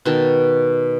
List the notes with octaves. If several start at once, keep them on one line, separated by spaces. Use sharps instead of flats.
B2 D#3 A5